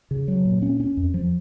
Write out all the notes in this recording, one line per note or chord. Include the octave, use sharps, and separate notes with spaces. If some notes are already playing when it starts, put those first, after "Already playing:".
C#3
F#3
A#2
C#4
C#4
F2
F3